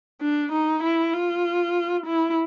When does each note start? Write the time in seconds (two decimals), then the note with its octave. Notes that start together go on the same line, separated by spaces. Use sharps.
0.21 D4
0.52 D#4
0.83 E4
1.13 F4
2.06 E4